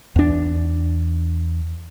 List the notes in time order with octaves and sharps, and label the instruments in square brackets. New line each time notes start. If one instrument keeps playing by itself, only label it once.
[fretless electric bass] E2 D4